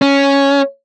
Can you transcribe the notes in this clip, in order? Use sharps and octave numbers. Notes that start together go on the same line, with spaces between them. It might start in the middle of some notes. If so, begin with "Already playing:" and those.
C#4